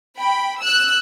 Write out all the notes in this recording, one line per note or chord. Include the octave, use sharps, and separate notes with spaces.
G5 B5
E6 F#6